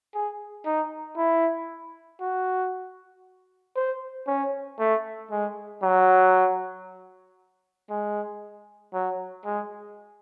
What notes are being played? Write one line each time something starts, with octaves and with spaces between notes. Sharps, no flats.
G#4
D#4
E4
F#4
C5
C#4
A3
G#3
F#3
G#3
F#3
G#3